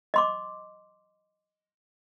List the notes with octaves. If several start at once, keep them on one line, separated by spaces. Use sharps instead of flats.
D#5 C6 D6